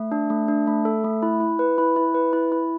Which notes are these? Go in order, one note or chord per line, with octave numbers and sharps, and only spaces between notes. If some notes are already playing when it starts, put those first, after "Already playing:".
Already playing: A3
D4
A3
D4
A3
A4
A3
E4
E4
B4
E4
E4
B4
E4
E4